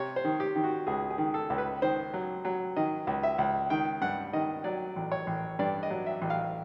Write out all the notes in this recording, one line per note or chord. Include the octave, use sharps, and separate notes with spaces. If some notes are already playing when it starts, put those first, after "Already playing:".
Already playing: C3 C#5
C5
D#3
G4
D#3
F#4
C#2 G#4
G#4
D#3
A4
C#2
B4
D#3 C5
F#3
F#3
D#3 D#5
C#2
E5
C#2
D#3 G5
G2 F#5
D#3 D#5
F#3 D5
A1
C#5
A1
G2 D5
D#5
F#3
E5
A1
F5